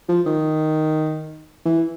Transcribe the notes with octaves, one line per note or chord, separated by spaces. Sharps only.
F3
D#3
E3